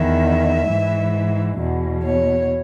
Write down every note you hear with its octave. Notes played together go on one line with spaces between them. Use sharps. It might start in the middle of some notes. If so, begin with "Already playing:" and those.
Already playing: E2 D#3 E5
G#2 E3
E2 B2
C#5